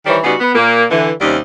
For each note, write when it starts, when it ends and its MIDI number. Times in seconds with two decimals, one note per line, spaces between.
0.06 0.18 51
0.06 0.18 52
0.06 0.18 55
0.06 0.18 72
0.06 0.18 73
0.24 0.34 49
0.24 0.34 55
0.24 0.34 59
0.24 0.34 63
0.24 0.34 66
0.40 0.52 59
0.55 0.84 46
0.55 0.84 58
0.91 1.11 50
0.91 1.11 52
1.21 1.37 39
1.21 1.37 48
1.21 1.37 55
1.21 1.37 61
1.21 1.37 63